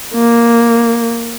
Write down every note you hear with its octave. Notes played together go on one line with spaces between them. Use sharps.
A#3